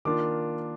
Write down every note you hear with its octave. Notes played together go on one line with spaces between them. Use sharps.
D#3 A#3 D4 F4 D6